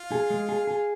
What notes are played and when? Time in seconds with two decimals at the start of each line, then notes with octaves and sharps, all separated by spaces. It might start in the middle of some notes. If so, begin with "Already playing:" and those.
Already playing: F4
0.12 G#4
0.30 G#3
0.49 G#4
0.67 G#4